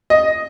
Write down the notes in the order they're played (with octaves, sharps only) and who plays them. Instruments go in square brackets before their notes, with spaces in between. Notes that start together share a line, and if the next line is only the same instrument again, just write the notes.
[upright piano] D#5